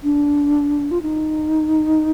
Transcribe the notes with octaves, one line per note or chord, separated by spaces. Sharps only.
D4
F4
D#4